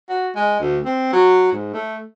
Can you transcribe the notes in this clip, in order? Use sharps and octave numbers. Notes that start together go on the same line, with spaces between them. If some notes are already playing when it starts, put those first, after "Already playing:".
F#4
G#3
D2
C4
F#3
G#2
A3